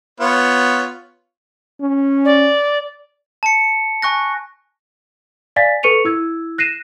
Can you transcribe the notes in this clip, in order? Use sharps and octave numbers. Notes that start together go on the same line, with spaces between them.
B3 F4 C#5
C#4
D5
A5 C#7
G#5 C#6 F#6 A#6
D5 F5 G#5 A6 B6
A4 B4 C#6 C#7 D#7 F7
E4 E6 G#6
F#6 A#6 C7 D#7 E7